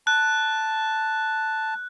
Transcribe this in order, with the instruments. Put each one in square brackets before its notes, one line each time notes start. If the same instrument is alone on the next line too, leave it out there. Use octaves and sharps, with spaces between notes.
[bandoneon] A5 [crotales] F#6